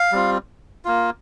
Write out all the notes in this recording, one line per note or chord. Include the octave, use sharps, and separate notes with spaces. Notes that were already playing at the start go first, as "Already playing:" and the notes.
Already playing: F5
G3 C4 F4
A#3 F4